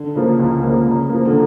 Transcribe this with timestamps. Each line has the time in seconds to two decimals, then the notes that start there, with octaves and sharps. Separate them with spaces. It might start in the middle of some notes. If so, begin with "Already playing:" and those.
Already playing: D3
0.16 C#3 F3 A#3
0.39 C#2
0.63 C#3 F3 A#3
0.87 C#3
1.09 F3 A#3
1.25 D3